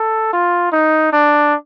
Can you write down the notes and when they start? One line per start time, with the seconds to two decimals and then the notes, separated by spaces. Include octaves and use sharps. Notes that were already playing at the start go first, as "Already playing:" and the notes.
Already playing: A4
0.33 F4
0.72 D#4
1.13 D4